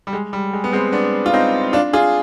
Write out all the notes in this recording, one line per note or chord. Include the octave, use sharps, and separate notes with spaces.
G3
G#3
G3
G#3
B3
G#3 C4
B3 D4
F4
C4 D#4
D4 F4
F4 G#4